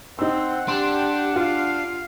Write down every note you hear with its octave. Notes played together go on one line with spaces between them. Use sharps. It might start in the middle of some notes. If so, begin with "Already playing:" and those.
C4 D#4 F#5 E6
D4 G4 C6
F4 F5